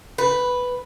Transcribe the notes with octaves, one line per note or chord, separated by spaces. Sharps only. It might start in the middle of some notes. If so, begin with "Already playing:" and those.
B4